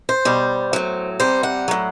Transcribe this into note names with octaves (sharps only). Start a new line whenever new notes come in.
C5
B2 G3
A2 F#3
C3 G3 C5
F#5
A2 F#3